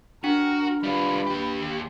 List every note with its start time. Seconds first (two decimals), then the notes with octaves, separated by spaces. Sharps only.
0.24 D4 F#4 A#4
0.83 G3 F4 B4
1.27 D#2 G4